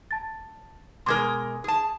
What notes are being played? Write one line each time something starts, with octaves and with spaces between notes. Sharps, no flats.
A5 A6
B2 G#3 A#4 C6 D6 G#6
G#4 A5